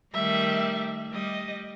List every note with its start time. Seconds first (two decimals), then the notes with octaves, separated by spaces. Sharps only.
0.14 D#3 G3 A3 E5
1.13 G3 D#5